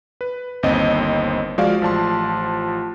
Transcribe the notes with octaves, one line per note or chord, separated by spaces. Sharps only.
B4
G1 D#2 C4 D#5
F3 G#3 F#4 D5 F5
A1 F3 A5 C6